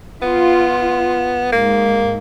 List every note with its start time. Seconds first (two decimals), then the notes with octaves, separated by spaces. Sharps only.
0.22 B3 F4
1.52 G#2 A#3